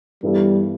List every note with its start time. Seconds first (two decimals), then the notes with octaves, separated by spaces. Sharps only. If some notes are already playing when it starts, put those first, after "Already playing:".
0.23 G2 E3 G3 B3 E4 A4